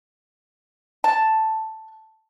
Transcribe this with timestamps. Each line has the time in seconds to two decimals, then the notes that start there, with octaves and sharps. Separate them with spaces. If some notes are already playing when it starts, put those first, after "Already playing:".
1.04 A5